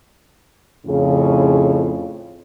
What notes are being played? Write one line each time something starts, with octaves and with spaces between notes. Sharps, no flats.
F2 A2 C#3